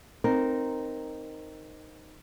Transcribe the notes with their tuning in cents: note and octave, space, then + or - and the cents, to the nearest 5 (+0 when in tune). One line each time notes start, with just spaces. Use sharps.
C4 +0 D#4 -5 A#4 +0